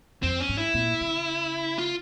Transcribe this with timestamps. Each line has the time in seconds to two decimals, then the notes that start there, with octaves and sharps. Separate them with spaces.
0.23 F2 C4
0.40 C#4
0.49 G#2
0.58 E4
0.74 A#2
1.01 C#3
1.78 F4